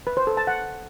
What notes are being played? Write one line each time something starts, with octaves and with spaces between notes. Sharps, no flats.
B4
C5
A4
A5
F#5